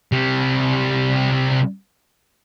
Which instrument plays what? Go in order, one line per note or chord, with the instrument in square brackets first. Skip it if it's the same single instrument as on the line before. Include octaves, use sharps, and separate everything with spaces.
[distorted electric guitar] C3 G3